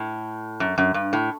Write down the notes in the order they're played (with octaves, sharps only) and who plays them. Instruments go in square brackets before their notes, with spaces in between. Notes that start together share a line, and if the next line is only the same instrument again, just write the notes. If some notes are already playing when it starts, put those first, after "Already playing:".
Already playing: [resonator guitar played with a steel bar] A2
F#2
F#2
G2
A2